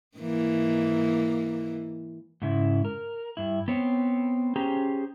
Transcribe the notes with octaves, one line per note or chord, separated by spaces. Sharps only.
G#2 E3 A#3
G#2 C#3 E4
A#4
G2 E4
B3 C4 C#5
C#4 G4 G#4 C5 A#5